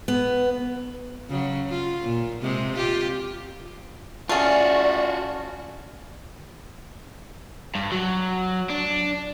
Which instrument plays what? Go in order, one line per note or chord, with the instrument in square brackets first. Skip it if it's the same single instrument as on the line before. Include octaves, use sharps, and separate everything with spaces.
[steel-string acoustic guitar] B3
[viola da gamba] C#3 F#3
F4
A#2
C3 G#3
F4 G4
[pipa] A3 G#4 [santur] C#4 F5 [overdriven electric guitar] F4 F#4 [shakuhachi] D5
[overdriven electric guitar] G2
F#3
D4